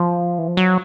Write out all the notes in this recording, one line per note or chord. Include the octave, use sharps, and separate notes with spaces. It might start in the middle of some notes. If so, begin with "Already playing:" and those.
Already playing: F3
E3
F3
F#3